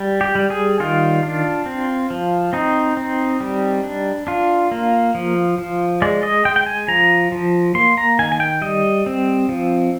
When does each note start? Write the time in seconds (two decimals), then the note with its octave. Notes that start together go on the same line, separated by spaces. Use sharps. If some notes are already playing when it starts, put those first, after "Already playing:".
Already playing: G3
0.21 G4
0.35 G3
0.50 G#4
0.80 D#3 F4
1.23 D4
1.66 C4
2.10 F3
2.53 C4 D#4
2.97 C4
3.40 G3
3.84 D4
4.27 D4 F4
4.71 A#3
5.15 F3
5.58 F3
6.02 G#3 D5
6.23 D#5
6.45 G#3 G5
6.56 G5
6.66 G#5
6.88 F3 A#5
7.32 F3
7.75 A#3 C6
7.98 A#5
8.19 D#3 G#5
8.32 G#5
8.40 G5
8.62 G3 D#5
9.06 C4
9.49 F3